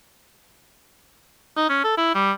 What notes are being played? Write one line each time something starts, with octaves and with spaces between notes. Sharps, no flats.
D#4
C#4
A4
E4
G3